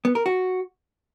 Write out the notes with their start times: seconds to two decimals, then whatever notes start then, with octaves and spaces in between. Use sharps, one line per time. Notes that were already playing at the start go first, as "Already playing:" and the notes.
0.05 B3
0.15 A#4
0.26 F#4